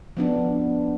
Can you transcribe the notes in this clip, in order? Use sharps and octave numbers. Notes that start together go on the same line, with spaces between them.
F3 B3 D4